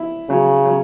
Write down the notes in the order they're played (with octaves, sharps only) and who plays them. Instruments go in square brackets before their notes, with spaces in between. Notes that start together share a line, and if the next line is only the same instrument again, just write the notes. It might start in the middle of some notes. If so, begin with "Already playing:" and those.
Already playing: [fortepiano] E4
[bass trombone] C#3 [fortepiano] F#3
[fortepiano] F#3